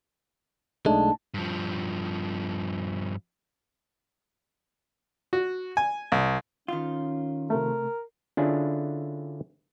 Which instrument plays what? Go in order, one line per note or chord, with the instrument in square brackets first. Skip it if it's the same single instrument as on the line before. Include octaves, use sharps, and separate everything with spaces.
[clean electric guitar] B1 G#3 [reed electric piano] A3 D4 D#4 [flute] A5
[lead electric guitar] G2 F3
[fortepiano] F#4
G#5
C2
[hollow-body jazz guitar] D#3 F4 [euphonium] C#4
[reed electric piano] C3 A3 [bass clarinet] A#4
[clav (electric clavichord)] D3 C#4 D4 E4 F4 G#4